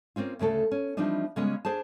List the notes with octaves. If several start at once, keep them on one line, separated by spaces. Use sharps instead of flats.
A#3 C4 C#4 F4
D2 C#3 A3 A4
C#4
E3 F3 G3 C4 D4 D#4
C#3 G3 G#3 B3 C#4
D4 G#4 C5 A5